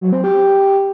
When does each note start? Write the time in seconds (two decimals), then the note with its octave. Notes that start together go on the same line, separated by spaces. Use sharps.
0.01 F#3
0.13 C4
0.24 G4